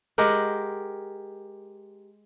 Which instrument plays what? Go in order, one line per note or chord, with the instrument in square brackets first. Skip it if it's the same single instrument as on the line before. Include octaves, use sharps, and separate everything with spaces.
[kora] G#3 G4 A#4 F#5